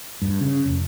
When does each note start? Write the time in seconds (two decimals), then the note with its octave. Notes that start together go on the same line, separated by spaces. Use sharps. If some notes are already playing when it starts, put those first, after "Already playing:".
0.22 G2
0.41 C#3
0.66 F1